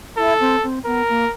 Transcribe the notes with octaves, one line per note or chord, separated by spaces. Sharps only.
E4 A4
C4
C4
B3 A#4
A#3